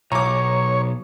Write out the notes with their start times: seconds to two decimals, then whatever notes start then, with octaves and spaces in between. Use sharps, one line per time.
0.12 B1 C#5 A#5 D6